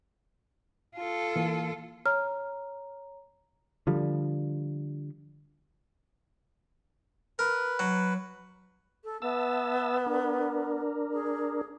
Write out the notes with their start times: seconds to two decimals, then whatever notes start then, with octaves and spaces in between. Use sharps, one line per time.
0.96 F4 A4
1.36 E3 A#3
2.06 C#5 A#5 F6
3.87 D3 F3 G3
7.39 A#4 B4
7.79 F#3
9.04 A4
9.22 B3 E5 A5 E6
10.06 D4 A#4
11.13 G#4